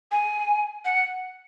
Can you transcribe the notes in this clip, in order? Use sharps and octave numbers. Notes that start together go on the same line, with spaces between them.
G#5
F#5